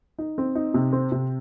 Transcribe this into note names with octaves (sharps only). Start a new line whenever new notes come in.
D#4
C4
D#4
C3
C4
C3